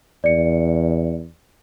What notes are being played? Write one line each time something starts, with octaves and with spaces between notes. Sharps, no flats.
E2 D5 C#7